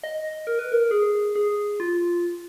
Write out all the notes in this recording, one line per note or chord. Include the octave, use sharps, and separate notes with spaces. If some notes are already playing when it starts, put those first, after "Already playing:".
D#5
A#4
B4
A#4
G#4
G#4
F4